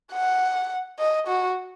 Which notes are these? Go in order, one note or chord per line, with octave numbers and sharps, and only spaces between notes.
F#5
D#5
F#4